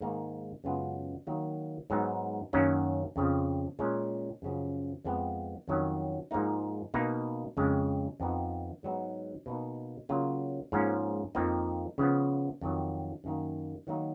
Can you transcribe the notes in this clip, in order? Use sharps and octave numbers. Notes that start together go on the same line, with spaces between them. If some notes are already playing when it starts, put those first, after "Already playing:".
G#2 D#3 A#3 D#4
F#2 C#3 G#3 B3 F4
D#3 F#3 A#3
G#2 F#3 B3 D#4
F#2 D#3 F#3 A#3 C#4
F2 C#3 F3
A#2 G#3 C#4
F#2 C#3 F3
F2 F3 G#3 B3
F2 D#3 F#3 C#4
G#2 F3 A#3 D#4
B2 A#3 D#4
F2 C#3 G#3
F2 F3 B3 D#4
G#2 F#3 B3 D#4
B2 A#3 D#4
C#3 F#3 A#3 F4
G#2 F3 A#3 C#4
F2 F3 A#3 D#4
C#3 F3 B3
F2 D#3 F#3
F#2 D#3 A#3
D#3 F#3 A#3 D#4